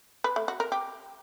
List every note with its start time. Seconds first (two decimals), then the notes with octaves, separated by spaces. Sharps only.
0.24 B4
0.36 A3
0.48 F#4
0.60 A#4
0.72 G4